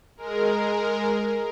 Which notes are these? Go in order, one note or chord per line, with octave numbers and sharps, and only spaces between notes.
G#3 A#4